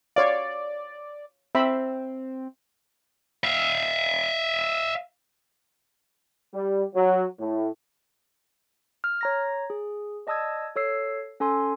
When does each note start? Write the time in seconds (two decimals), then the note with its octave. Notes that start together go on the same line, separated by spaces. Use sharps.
0.16 C#5 D5 F5
1.55 C4 E5 B5
3.44 E5 F5
6.54 G3
6.95 F#3
7.38 A2
9.04 F6
9.21 C#5 A#5 A#6
9.70 G#4
10.27 D5 D#5 A5 D#6 E6 G#6
10.76 A4 C#5 E6 C7
11.40 C#4 A4 G#5 C6